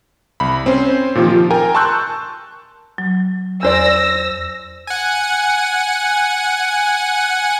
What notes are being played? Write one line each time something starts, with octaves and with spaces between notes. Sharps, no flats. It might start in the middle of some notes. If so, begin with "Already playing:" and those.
C2 B5
C4 C#4 C5
A#2 D#3 F3 F4 G4
F3
A#4 G5 G#5 A#5
A5 C6 C#6 E6 F#6 G6
F#3
E2 C#4 C5 D5 E6 A#6
F#5 G#5